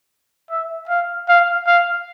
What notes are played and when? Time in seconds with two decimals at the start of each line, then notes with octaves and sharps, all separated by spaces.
0.50 E5
0.89 F5
1.29 F5
1.67 F5